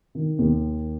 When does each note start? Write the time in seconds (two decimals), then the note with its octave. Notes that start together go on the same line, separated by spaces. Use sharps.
0.15 D#3
0.39 D#2